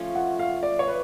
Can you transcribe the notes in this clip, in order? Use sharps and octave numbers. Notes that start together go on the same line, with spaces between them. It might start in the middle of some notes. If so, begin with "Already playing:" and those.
Already playing: F3 A3 C#4 F4
F#5
F5
D5
C#5
B4